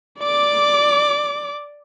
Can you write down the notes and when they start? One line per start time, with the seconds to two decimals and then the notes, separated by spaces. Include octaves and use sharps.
0.20 D5 D6